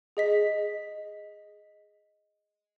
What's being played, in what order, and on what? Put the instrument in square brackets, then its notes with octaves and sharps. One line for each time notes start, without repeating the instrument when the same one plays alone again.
[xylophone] G#4 D#5 B6